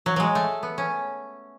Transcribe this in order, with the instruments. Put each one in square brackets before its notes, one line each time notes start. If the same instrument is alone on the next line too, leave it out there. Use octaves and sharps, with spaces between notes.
[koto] F#3
F#3 G#3
A3
B3
C#4